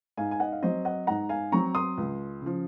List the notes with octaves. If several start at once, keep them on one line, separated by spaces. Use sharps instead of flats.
G#2 F5 G#5
G#5
D#5 F#5
F5
F#3 C4 C5 D#5
D#5 F#5
G#2 F#5 A#5
F5 G#5
F#3 C4 A#5 C#6
C6 D#6
C#2
C#3 F3